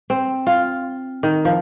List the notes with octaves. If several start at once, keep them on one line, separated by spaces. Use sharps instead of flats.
C4
F4
D#3
F3